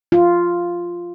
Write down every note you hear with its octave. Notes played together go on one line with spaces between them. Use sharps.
F4